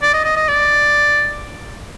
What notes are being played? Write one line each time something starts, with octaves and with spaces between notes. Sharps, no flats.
D5
D#5
D#5
D#5
D5